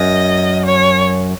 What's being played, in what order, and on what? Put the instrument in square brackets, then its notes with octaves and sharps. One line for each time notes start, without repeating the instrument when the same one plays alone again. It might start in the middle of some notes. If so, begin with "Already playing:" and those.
Already playing: [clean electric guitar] F#2 [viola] D#5
[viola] C#5